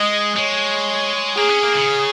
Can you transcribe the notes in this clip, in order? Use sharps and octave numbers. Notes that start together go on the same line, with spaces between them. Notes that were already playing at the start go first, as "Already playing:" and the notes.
Already playing: G#3 D#5
G#3 C#5
A#3 G#4
C#4
A#3
C#3